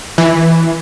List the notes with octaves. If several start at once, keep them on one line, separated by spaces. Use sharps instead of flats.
E3